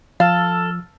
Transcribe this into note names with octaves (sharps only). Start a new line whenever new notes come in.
F3 A4 F5 E6 F6 A6